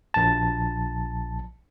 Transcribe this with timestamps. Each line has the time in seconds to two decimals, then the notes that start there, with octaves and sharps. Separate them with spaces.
0.14 A#1 A5